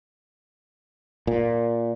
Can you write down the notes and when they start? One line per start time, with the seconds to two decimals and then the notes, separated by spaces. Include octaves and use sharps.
1.27 A#2